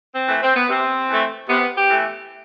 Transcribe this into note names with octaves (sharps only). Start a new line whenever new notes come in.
C4
E3 A3
C4
B3
C3 C4
E3 A3
C3 B3
G4
E3 A3